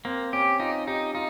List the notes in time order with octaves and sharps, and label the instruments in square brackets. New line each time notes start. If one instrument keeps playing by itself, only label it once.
[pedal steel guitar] A#3 [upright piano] C4
[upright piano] C#4 [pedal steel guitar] G4
[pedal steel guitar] D#4 [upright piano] F4
[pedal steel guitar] D#4 [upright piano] G4
[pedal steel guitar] D#4 [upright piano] F4